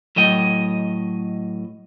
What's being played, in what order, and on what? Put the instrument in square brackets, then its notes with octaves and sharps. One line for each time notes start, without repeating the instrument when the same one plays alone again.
[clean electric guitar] A2 F#3 D#5 G5